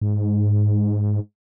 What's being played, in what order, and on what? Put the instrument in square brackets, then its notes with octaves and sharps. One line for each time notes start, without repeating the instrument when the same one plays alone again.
[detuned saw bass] G#2